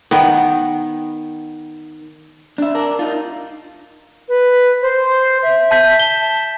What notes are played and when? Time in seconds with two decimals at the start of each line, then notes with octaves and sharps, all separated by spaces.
0.11 D#3 B3
2.58 D4 E5
2.75 D4 A#4
2.99 D#4 F4
4.29 B4
4.82 C5
5.43 E5
5.71 A5 G6 B6
5.99 A5 G7